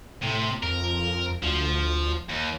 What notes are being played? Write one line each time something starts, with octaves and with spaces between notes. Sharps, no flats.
A2 C3
F2 A#4
D2 F3
D#2